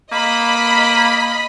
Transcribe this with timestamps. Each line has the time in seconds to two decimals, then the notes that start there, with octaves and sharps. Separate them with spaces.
0.12 A#3 D#5 B5